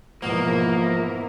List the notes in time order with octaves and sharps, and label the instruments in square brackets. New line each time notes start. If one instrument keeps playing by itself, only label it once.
[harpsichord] E2 G#2 B2 [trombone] F3 [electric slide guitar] A#3 [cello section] E4 A#4